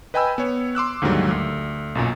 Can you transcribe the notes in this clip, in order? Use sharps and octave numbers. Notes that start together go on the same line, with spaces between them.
B4 D#5 G5 G#5 B5 E6
B3 C#5
C6 D6 E6 F#6
D#2 G#2 D3 D#3 F#3 G3
D2
B1 F#2 A#2